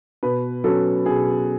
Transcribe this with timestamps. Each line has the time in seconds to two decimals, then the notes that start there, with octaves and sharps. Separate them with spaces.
0.23 B2 B4
0.64 F#3 C#4 A4
1.06 B2 G#4